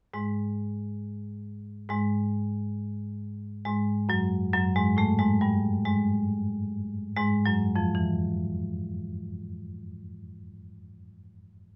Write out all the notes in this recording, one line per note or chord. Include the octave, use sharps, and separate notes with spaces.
G#2 G#3
G#2 G#3
G#2 G#3
F#2 F#3
F#2 F#3
G#2 G#3
A2 A3
G#2 G#3
G2 G3
G#2 G#3
G#2 G#3
F#2 F#3
F2 F3
E3